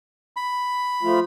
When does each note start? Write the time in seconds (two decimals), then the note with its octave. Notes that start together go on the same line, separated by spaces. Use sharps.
0.36 B5
1.03 F3 A3 F4